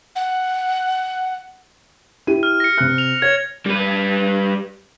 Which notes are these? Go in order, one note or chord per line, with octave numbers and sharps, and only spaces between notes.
F#5
E4 G4 D#7
F6
A#6 C#7
C3 F#6
F7
C#5 G#6
G3 B4